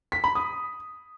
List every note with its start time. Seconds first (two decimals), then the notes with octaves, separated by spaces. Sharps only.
0.12 B6
0.24 B5
0.35 D#6